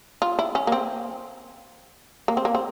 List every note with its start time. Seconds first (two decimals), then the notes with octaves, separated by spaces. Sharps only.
0.22 F4
0.39 E4
0.55 C#4
0.67 A#3
0.72 C4
2.28 A#3
2.37 C4
2.45 A#3
2.55 C4